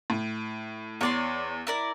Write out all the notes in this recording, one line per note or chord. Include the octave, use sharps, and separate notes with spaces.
A2
E2 C#5 D5 C6
E4 A#4 D5